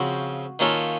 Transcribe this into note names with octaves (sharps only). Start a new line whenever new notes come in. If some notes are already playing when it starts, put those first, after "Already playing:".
Already playing: C#3 F3 C4 F#4
D#3 A#3 C#4 F4 A4